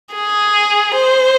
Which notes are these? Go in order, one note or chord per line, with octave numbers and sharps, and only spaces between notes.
G#4
C5